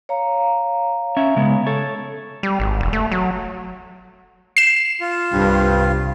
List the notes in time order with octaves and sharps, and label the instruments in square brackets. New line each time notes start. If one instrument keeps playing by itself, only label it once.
[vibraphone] C#5 F5 A#5
[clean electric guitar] C#4 E5
C#3 G#3 B3
A4 C#5
[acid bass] G3
G#1
E1
A3
F#3
[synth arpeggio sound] C7 E7
[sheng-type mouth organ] F4
[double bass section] C2 [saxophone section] G2